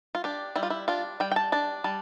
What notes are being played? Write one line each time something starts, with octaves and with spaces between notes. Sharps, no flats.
F4
D4 G4
G3 E4
F4
E4
D4 F4
G3 G5
G5
A5
D4 A5
G3 A5